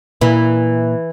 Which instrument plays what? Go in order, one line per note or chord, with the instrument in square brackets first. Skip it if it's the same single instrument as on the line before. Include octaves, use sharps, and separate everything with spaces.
[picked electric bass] A#2 [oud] E3